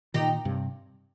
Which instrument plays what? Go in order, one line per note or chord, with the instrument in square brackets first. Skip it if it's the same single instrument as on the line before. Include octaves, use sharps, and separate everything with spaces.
[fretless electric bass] A#2 D#3 [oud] D#4 G4
[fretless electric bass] G2 C3